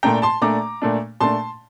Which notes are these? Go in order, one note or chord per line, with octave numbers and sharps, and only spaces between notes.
A#2 A3 D4 G5 A#5
A5 C6
A#2 A3 D4 A#5 D6
A#2 A3 D4
A#2 A3 D4 A5 C6